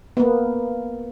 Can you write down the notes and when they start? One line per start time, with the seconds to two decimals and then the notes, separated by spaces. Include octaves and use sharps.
0.17 A#3 B3